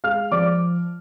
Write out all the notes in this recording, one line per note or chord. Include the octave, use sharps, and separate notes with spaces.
G#3 F5 F6
F3 D5 D6